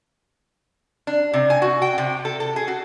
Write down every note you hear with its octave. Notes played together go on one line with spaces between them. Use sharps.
D4
C3
G#5
F#4
G5
C3
A4
A4
G#4
F#4